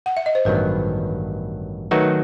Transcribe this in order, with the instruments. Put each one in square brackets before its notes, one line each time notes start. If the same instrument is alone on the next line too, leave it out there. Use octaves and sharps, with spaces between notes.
[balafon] F#5
E5
D#5
C5
[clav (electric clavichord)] A1 G2 D#3 F#3 B3 [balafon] B4
[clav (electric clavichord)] D#3 F#3 A3 D#4 F#4 [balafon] B4